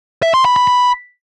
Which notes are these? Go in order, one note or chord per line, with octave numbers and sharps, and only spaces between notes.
E5
C6
B5
B5
B5